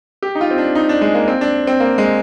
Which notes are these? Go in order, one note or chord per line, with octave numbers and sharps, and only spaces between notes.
G4
D#4
F4
C4
D4
D#4
D4
G#3
A#3
C4
D4
C4
A#3
G#3